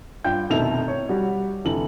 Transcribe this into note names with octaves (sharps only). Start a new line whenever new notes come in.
G2 F4 G5 G6
F1 B2 D#3 A3 E4 F7
C#5
G3 F#4 G4
F1 D3 E3 A4 F#7